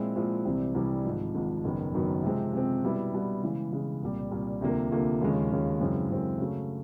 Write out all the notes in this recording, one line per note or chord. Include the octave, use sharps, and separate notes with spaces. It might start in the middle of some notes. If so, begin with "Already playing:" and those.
Already playing: A#2 F3 G#3 C4 E4
A#2 F3 G#3 C4 E4
C2 C3 E3 G3 C4
C2 C3 E3 G3 C4
G#1 G#2 F3
G#1 G#2 F3
F#1 F#2 D#3 F#3 B3
F#1 F#2 D#3 F#3 B3
C3 F3 G#3 C4
C3 F3 G#3 C4
B2 G3 B3 E4
B2 G3 B3 E4
C#3 E3 G#3
C#3 E3 G#3
C2 A#2 G3
C2 A#2 G3
D2 C3 F3 A#3
D2 C3 F3 A#3
D#2 C#3 F3 G#3 C#4
D#2 C#3 F3 G#3 C#4
F#2 C#3 E3 G#3 C4
F#2 C#3 E3 G#3 C4
C#3 F#3 A3